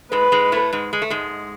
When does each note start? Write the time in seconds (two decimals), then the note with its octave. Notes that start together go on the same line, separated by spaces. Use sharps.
0.12 G#2 G#3 B4
0.32 G#2 G#3
0.52 A2 A3
0.73 G#2 G#3
0.93 G#3
1.02 A3
1.10 G#2 G#3